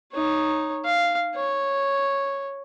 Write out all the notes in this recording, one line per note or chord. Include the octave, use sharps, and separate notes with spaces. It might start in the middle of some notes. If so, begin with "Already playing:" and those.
D#4 C#5
F5
C#5